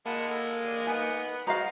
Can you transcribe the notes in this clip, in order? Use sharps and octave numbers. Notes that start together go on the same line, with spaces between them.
G#3 A#3 F#5 A5 B5
A4
D5
B3 D#4 G#5
G#3 F#4 C5 D#5 F5 A#5